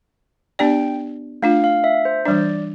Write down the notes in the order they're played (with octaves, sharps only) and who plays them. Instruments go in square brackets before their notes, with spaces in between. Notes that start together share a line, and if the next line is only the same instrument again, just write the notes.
[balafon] B3 D4 G4 D5 [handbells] G5
[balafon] A3 D4 F4 [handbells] F5
[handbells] F5
E5
C5
[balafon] E3 G3 D4 [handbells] D5